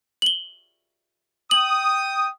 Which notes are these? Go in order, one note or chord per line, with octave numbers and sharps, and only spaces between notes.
F#7 G7
G5 D#6 F#7